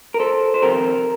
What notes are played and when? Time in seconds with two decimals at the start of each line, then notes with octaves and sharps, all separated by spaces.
0.14 A#4
0.19 A4 C5
0.54 C5
0.62 F2 C3 D#3 G4 A#4